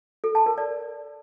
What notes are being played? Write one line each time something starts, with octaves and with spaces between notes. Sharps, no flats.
A4
A5
A#4
D5